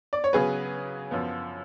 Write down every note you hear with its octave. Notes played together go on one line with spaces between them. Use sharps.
D5
C#5
C#3 F#3 B3 G#4 B4
F#2 F3 B3